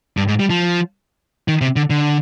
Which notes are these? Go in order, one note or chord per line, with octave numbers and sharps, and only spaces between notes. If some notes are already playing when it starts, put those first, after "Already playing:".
G2
G#2
G3
F3
D#3
C3
D3
D3